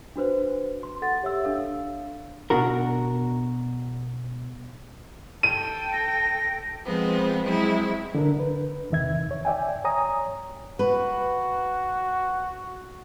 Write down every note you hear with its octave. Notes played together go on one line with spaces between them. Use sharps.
D4 F#4 B4 C5
C6
A4 F#5 A6
G4 C#5 E5 E6
D4 A4 F5
B2 D4 F#4 A#4
A4 G5 D#7
A#6
F3 G#3 B3 C4
F#3 G#3 C4 E4
D3 D4 A#4
B4
E2 C3 D#3 E5 G#6
D#2 C#5
D5 E5 G5 G#5
C#5 G#5 A#5 D#6
F#4 B4